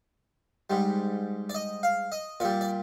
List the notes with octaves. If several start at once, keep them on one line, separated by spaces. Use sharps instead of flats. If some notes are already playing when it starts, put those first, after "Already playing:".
G#2 G3
D5
D#5
F5
D#5
A#2 G3 D5
D5